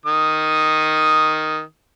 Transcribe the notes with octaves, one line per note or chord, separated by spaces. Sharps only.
D#3 D#6